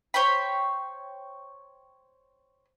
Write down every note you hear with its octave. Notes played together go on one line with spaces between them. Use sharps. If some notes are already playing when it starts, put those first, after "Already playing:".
C5 C#5 G5 B5